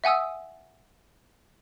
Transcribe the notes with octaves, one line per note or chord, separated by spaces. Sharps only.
E5 F#5 G#5 D#6 E6